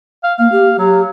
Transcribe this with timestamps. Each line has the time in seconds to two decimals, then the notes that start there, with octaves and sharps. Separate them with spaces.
0.24 F5
0.39 A#3 F5
0.52 G4
0.78 F#3 G4